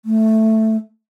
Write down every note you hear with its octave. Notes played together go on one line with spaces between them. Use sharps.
A3